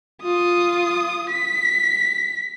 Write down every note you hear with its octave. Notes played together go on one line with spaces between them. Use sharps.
F4 D#6
B6